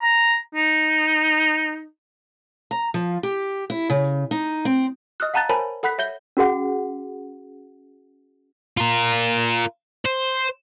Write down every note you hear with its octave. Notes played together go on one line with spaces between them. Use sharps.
A#5
D#4
A#5
F3
G4
E4
C#3
D#4
C4
D#5 D#6 F6 F#6
F5 F#5 A5 A#5 F#6 A6
A#4 C5 C#5 G#5 A5 B5
A4 F#5 B5 F#6 B6
C#5 E5 G6 G7
C#4 F#4 G#4 F#5
F4 A#4
C5